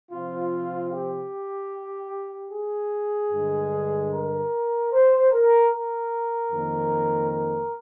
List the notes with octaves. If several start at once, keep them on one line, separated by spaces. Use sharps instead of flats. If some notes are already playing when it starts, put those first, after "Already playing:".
C3 F3 C4 F4
G4
G#4
G2 D3 G#3
A#4
C5
A#4
A#4
F2 D#3 A#3
A#4